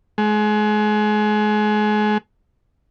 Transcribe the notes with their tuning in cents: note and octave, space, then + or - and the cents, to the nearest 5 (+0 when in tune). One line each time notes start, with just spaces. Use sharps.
G#3 +30